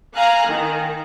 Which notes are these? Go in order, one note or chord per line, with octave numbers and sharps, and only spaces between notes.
F5 G#5 A#5 F#6
D#3